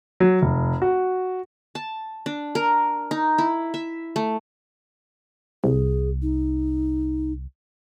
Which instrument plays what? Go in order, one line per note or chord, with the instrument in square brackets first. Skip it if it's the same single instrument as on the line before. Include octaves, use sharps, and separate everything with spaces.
[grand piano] F#3
F1
F#4
[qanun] A5
D4
A#4
D#4
E4
E5
A3
[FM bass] C2 [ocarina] G#4
[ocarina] D#4